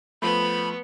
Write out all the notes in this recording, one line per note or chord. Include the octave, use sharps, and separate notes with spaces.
F3 A3 B3 B5